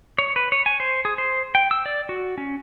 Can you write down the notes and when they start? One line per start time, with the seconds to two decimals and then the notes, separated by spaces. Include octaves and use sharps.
0.18 C#5
0.36 B4
0.52 C#5
0.66 G#5
0.80 C5
1.05 G#4
1.18 C5
1.55 G5
1.71 E6
1.86 D5
2.09 F#4
2.38 C#4